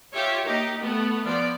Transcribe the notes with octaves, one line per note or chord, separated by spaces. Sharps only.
F4 G4 C#5 E5
A#3 D#4 G4
A3 B3
F3 B3 D5